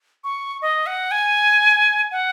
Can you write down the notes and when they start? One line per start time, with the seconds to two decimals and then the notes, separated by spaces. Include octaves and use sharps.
0.24 C#6
0.62 D#5
0.87 F#5
1.11 G#5
2.11 F#5